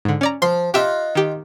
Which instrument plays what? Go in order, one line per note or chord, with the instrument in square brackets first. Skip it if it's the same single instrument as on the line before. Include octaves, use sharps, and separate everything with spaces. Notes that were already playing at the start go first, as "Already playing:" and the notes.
[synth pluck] G#2 D3
C#4 D5 A#5
[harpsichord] F3 [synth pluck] C6
[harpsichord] D#4 F4 F#5 [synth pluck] G4 E5
[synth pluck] D#3 G4